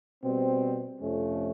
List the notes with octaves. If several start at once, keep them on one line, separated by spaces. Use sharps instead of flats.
B2 G3 C4
F2 C3 F3 A3 C#4